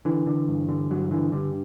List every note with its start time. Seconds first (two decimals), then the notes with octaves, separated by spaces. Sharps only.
0.05 D3 E3
0.26 D3
0.48 G2
0.69 D3
0.90 G2 F#3
1.11 D3 E3
1.32 G2 D3